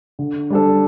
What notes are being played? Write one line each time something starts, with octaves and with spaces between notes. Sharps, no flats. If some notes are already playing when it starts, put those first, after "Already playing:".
D3
G3 D4 A4